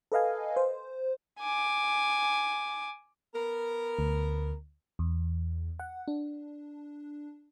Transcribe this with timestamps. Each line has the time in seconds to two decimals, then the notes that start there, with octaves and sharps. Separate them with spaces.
0.12 A4 B4 D#5 F5 G#5
0.56 C5
1.40 G#5 D6
3.35 B3 A#4
3.99 D2
4.99 E2
5.79 F#5
6.08 D4